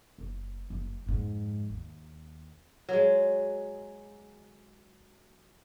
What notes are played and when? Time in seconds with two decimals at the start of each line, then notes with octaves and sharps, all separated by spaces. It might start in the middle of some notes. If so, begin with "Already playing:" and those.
0.18 F#1
0.70 F#1
1.06 F2 G#2
1.69 D#2
2.89 F#3 G#3